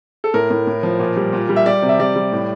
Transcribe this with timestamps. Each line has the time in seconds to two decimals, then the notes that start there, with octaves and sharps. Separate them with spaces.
0.24 A4
0.34 A2 A#4
0.50 A2
0.67 A2
0.83 F3
1.00 A#2
1.16 G3
1.33 A#2
1.49 G3
1.56 E5
1.66 G3 D5
1.82 C3
1.89 E5
1.99 G3 D5
2.16 G3
2.32 A2